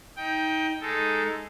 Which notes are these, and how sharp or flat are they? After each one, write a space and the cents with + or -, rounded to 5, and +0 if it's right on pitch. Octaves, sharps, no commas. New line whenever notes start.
D#4 +25 G5 +0
G#3 +0 D#4 +0 A4 +0